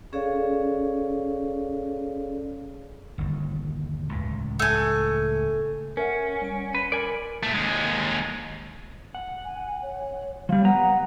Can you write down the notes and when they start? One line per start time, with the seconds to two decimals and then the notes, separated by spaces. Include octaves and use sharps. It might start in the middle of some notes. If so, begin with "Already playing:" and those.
0.13 C#4 G#4 A4 C#5 D5 F5
3.18 G1 D#2
4.09 C#2 A2
4.60 A3 G#5
5.97 C#4 A#4 E5 F#5
6.42 G3 D7
6.75 B4 B5 C6 C#7
6.92 A#4 D5 G#5 B5
7.43 A#2 A3
7.55 D#2 G#3
9.15 F#5
9.45 G#5
9.82 C#5
10.49 F3 G3 F5
10.65 B3 B4 F#5 A#5